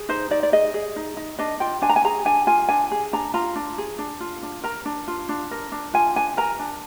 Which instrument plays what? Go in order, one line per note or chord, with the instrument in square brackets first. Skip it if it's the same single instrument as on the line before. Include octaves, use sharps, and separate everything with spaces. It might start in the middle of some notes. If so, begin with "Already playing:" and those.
Already playing: [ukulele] G#4
D#4 C5
D#4 D5
D5
G#4 D#5
G#4
D#4
D#4
D4 D#5
F4 G5
D4 G#5
A#5
G#5
G#4 A#5
D4 G#5
F4 G#5
D4 G#5
G#4
D4 A#5
F4 A#5
D4
G#4
D4
F4
D4
A#4 A#5
D4
F4
D4
A#4
D4
F4 G#5
D4 G#5
A#4 A#5
D4